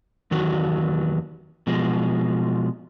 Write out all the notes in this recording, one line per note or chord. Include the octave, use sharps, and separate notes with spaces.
E2 D#3 F#3 F#4
B2 F3 G#3